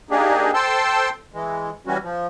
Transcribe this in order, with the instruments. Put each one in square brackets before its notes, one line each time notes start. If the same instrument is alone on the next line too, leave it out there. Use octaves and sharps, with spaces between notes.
[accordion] A#3 D4 D#4 G4 G#4
A4 C5 G5 A5 C6 E6
E3 G#3
E3 G3 C#4 F#4
F3